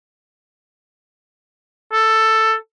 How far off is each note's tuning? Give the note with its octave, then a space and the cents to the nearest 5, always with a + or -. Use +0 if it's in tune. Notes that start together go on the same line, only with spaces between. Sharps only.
A4 +10